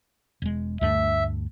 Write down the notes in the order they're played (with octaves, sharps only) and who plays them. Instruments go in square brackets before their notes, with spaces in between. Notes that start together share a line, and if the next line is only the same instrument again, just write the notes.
[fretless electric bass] E1 G#3
[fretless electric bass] D2 G2 A3 [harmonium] E5